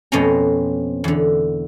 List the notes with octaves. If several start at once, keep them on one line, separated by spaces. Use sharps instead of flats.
F2 B2 A3 C4 C#4 A#5
E2 D3